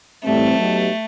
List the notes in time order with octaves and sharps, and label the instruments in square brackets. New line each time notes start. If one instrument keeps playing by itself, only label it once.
[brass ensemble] A2 E3 G3 C4 [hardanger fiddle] A3
[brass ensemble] F#3 B3 D#4 G4